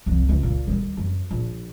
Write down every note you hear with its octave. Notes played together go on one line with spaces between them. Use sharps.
C2 F3
C#2
A#2
D#3 G3
F#2
A#1